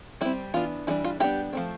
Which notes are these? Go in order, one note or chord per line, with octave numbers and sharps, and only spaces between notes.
G3 C4 E4
E3 B3 D4 F4
E3 G3 D4 E4
F4
G3 B3 D4 E4 G4
F3 A3 C4